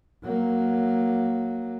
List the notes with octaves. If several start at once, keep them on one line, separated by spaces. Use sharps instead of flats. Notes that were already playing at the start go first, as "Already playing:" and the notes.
F#3 A#3